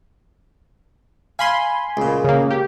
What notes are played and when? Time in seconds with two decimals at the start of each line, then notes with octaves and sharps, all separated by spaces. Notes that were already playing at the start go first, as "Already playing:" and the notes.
1.39 F5 G#5 B5 C6
1.97 C#2 A#2
2.24 C#3 A#3
2.51 G4